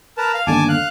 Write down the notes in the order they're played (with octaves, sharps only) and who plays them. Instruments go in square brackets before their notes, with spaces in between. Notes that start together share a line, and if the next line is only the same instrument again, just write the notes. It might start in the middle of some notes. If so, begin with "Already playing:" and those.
[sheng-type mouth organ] A#4 B4 A5
F5
[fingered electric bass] G1 D#2 D3 [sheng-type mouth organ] G#5 A5 D6
[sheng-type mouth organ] F5 F#6